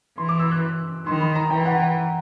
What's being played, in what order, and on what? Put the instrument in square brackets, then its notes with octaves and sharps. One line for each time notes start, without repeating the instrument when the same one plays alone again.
[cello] E3 [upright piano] C6
[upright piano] D6
E6
F#6
[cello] D#3 [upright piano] C6
[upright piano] B5
A#5
[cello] E3 [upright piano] G5
[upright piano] F#5
G5